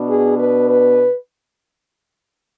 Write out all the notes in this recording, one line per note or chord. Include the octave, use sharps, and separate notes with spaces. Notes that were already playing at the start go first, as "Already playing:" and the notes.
Already playing: B2 B3 D4
G#4
B4
B4